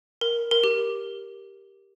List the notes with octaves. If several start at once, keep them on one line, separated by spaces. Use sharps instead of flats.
A#4
A#4
G4